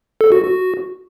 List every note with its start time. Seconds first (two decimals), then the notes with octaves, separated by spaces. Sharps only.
0.21 A4
0.32 F#4
0.43 F#4